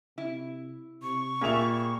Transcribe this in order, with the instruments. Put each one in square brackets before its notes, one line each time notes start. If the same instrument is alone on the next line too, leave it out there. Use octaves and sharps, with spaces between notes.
[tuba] C3 [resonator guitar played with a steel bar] E4
[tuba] C3 [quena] C#6
[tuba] A#2 [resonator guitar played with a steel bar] G3 E5 [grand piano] A#3 G#4 F7